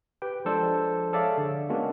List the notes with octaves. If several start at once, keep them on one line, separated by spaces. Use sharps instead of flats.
G4 B4 G5
F3 G#3 D4 A4 C5 D5
G#4 A4 C#5 D5 E5 F5
D3
G#3 A#3 B3 C#4 D4 F#4